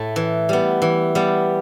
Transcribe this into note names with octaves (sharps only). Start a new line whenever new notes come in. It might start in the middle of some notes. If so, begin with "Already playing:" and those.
Already playing: A2 A3
E3
G3 B3
E3
G3 B3